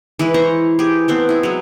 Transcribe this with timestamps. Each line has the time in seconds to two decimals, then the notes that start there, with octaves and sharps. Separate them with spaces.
0.19 E3 G#3 E4 B4
0.34 E4 C5 A#5 C#6
0.79 G4 G#4
1.08 A3 B3 C4
1.29 E4 G#4
1.43 F#3 G#3